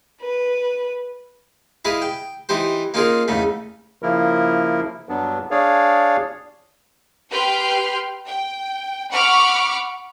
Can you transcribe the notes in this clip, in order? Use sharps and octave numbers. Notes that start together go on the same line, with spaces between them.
B4
E4 G#4 B4 D#5 F5
G5
E3 D#4 G4 C5
A#3 C#4 D#4 F4 G#4 A#4
E2 C#3 A3 D#4
C#3 F3 A#3 E4 A#4
G2 F#3 B3 D4
D4 G#4 C#5 D5 F5
G4 B4 G5 C6 F6
G5
F#5 B5 C#6 D6 F6